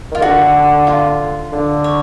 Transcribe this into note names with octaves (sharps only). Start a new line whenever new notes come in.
D#3 F4
D3 F#4
F4
D3
C#5